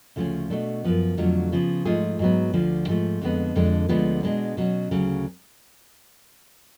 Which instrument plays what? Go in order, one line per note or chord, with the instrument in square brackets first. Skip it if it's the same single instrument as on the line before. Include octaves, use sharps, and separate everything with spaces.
[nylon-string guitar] D2 C#3 F3 A3 C#4
B2 A3 D4
F#2 F3 B3
F2 D3 F#3 A3 F4
C#3 F3 B3
G#2 F3 A3 F4 G#4
G#2 F#3 B3
D2 D3 F3
G#2 F3 A3
F2 D3 G#3 B3
F2 D3 G#3 D4
D2 D3 F3 G#3 B3
B2 G#3 B3 D4
B2 F#3 C#4
D2 C#3 F#3